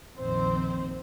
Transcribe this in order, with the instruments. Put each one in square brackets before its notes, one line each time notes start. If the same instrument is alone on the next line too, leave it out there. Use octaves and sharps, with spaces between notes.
[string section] A#1 F2 D#3 C4 C5